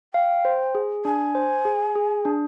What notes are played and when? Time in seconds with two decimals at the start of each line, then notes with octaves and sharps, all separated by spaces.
0.14 F5 G5
0.45 C5
0.75 G#4
1.05 D4 G#5
1.35 C5
1.65 G#4
1.95 G#4
2.25 D4